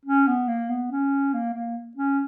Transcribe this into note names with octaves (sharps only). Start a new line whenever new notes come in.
C#4
B3
A#3
B3
C#4
A#3
A#3
C#4